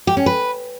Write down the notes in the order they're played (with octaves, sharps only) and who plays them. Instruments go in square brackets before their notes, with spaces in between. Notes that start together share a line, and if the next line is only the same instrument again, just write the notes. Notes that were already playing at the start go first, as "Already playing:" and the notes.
[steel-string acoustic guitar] G4
C#4
B4